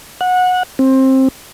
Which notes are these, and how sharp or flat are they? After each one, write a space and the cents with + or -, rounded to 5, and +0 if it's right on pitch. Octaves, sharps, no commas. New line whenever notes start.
F#5 -20
C4 +20